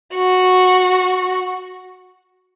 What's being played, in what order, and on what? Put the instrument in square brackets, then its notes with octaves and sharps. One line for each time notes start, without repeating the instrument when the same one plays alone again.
[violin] F#4